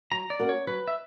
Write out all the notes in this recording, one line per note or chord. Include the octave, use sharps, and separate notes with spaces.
F#3 A#5
D5
A#3 C#4 F#4 A#4
C#5
F#3 B4
E5